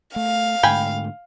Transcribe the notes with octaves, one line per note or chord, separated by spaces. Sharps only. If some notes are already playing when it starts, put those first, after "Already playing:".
A3 F5
G#2 D3 A3 G5 G#5 B5